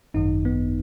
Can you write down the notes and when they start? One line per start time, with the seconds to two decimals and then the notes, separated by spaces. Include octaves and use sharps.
0.14 G#1 F#2 D#3 D#4
0.45 B3